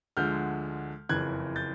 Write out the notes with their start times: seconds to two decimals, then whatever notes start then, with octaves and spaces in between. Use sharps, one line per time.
0.17 D2 D3 F3 G#3 F6 G6
1.09 F#1 F2 C#3 E3 F#6 G#6
1.56 G6 A6